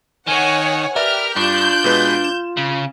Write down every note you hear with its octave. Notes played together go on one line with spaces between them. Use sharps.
D#3 C#5 F#5 G#5
G4 A#4 B4 D5 E5 F6
G2 D4 F4 G6
B2 G#3 B4
E7
C#3